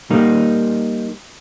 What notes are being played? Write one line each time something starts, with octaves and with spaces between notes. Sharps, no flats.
G3 A#3 D#4